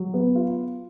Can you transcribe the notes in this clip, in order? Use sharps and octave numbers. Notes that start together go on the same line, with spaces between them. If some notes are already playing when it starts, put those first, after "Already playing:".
Already playing: F#3
B3
F4